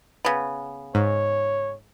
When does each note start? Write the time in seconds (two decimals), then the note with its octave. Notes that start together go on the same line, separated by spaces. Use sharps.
0.25 C#3 B3
0.95 G#2 C#5